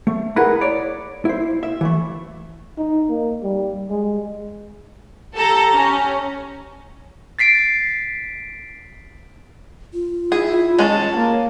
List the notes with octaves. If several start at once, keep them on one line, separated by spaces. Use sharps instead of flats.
A3
E4 G#4 A#4 B4 F#5 B5
C#5 D5
E4 C5
E5
E3 A3
D#4
A#3
G3
G#3
G4 A4 A#5
C#4
A6 B6 C7 D7
F4
E4 G#4
G#3 C#4 A5
A#3